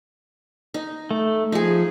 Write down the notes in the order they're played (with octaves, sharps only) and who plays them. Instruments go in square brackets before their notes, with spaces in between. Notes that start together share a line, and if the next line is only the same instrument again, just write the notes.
[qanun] D#4
[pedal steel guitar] A3
[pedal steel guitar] F3 [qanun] D#4 G#4